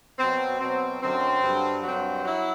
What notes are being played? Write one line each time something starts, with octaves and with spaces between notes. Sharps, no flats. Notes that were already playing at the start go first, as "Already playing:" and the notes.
B2 F#3 C4
B2 F#3 C4
F#2 D3 F#3 C4
G2 D3 F#3
G2 F#3 C4
F#3 E4